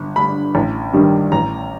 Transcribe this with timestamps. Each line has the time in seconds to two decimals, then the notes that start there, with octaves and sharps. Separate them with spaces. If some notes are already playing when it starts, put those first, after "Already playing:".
Already playing: G1
0.16 G2 D3 B5
0.55 A1
0.93 G2 D#3 G3
1.32 A1 A#5